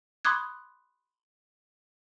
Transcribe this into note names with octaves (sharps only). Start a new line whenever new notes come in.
B5 C6 D6 D#6 F#6 G#6